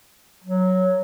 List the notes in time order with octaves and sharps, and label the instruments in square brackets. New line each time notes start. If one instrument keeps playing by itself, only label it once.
[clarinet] F#3